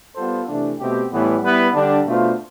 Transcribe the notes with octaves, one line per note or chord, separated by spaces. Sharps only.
G3 B3 F4 A4 C5
C3 E3 A3 D4
B2 A3 C4 G4
A2 E3 G3 B3
G3 B3 E4 B4
D3 G3 D4
B2 A3 D4 F4 C5